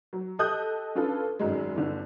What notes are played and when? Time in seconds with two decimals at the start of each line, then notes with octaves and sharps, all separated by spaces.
0.13 F#3
0.39 G4 A4 D#5 D#6 F#6 G6
0.95 C#4 D4 F4 A4 B4
1.39 G#1 F#2 F#3 G#3
1.76 G1 D3